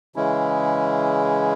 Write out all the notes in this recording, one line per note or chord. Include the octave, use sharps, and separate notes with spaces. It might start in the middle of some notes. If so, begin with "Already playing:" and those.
C#3 E3 G#3 C#4 E4